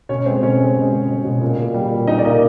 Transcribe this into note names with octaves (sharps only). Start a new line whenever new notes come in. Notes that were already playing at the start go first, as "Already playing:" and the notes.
B2 C#4 C#5
G#3 C4 C5
B2 C#4 C#5
G#3
G#3
B2
G#3
B2
A#2
A#2
G3
A#2
A#2 D#4 D#5
D5
A#3 D#4 D#5